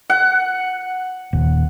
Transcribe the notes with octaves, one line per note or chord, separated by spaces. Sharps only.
F#5
D#1